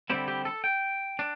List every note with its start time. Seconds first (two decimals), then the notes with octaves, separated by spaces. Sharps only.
0.10 D3 G3 C4 E4 G4
0.28 G4
0.45 A4
0.64 G5
1.19 D4